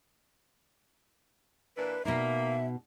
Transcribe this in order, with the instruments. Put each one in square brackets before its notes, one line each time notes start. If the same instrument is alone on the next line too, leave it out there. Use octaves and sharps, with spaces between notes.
[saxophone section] A#2 E3 D4 [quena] B4
[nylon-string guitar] B2 D#4 [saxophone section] A#3 [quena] E5